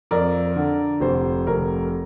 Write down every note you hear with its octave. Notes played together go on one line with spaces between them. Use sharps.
F2 A#4 D5
D3
F1 C5
F1 A#4